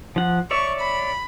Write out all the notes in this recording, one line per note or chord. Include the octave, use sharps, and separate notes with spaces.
F3 F#5
C#5 D5 E5 C#6
B5